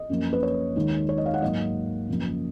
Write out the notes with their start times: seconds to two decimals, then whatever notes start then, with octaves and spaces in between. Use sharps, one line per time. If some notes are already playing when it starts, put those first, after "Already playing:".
Already playing: D#5
0.10 F#2 F3 A#3
0.33 B4
0.43 C#5
0.76 D#2 D#3 G#3
1.09 C#5
1.18 D#5
1.26 F5
1.34 F#5
1.42 G#2 F#3 A#3 D#5
2.09 F#2 C#3 F3 A#3